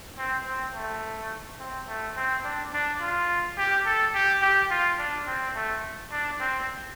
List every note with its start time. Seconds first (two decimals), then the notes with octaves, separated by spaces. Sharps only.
0.18 C4
0.47 C4
0.75 A3
1.60 C4
1.88 A3
2.16 C4
2.45 D4
2.73 D4
3.01 F4
3.58 G4
3.86 A4
4.14 G4
4.42 G4
4.70 F4
4.98 D4
5.27 C4
5.56 A3
6.12 D4
6.41 C4